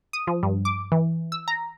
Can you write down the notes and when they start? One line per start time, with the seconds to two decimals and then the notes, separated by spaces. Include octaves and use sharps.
0.13 D#6
0.27 F3
0.43 G2
0.65 D6
0.92 E3
1.32 E6
1.48 A#5